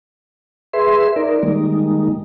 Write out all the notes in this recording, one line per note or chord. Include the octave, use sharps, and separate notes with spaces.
G#4 B4 E5 C6
D#4 A#4 D5
D#3 G3 G#3 A#3 D#4